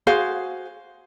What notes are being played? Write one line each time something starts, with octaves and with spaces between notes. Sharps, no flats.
F#4 G#4 C5 F5